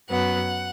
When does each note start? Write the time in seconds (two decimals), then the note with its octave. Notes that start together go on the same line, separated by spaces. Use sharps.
0.09 F#2 F#3 B3 F#5